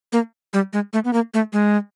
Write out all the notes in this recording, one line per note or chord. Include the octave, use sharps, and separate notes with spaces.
A#3
G3
G#3
A3
B3
A#3
A3
G#3